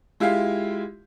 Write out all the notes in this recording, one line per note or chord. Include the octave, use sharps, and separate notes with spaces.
G#3 E4 F4 G4 E5 F5